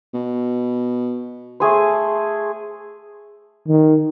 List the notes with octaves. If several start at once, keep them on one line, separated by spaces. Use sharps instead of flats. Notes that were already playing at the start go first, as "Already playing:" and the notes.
B2
A3 G#4 C5
D#3